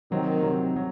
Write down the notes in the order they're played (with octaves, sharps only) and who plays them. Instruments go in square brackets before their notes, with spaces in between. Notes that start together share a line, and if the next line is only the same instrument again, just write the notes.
[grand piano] C3 F#3 C4 [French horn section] D#3
[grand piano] C3 F#3 C4
C3 F#3